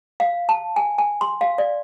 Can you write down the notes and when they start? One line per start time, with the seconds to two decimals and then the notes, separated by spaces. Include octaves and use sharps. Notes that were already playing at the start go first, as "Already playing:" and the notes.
0.20 F5
0.49 A5
0.76 G#5
0.98 G#5
1.21 C6
1.41 F5
1.58 D5